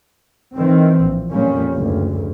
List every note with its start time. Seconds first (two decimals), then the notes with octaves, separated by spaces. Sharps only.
0.56 D#3 E3 C4
1.00 A#1
1.31 F2 A#2 G3 A#3 C#4
1.74 F#1 D2 G2